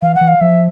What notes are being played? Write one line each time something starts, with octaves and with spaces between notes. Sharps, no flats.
E3 F5
F#5
E3
F5
F3 E5